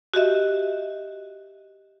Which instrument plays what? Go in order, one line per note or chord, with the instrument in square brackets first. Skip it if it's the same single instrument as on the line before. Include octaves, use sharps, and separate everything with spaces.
[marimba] F#4 G4 D#5 E5